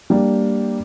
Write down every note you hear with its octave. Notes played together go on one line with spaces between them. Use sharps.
G3 A#3 D4